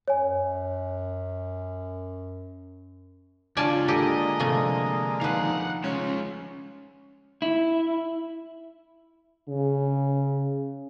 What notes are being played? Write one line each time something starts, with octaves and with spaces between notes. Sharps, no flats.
F#2 C#5 G#5
C#2 C#4 D4 F4 D5 G#5 A5
D3 G#3 A#3 G4 A4 D#5
C3 F3 A3
D#3 F3 B4 F5 F#5
G#3 C#4 F4
E4
C#3